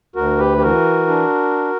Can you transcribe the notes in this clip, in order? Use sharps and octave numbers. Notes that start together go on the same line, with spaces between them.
D2 F#4 A#4
G4 B4
G4
E3 F#4 A#4
D4